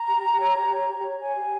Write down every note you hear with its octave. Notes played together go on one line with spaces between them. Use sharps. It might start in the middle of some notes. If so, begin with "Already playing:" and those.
Already playing: A#5
G4
G4
C#5
G4
C#5
G4
C#5
C#5 G#5
G4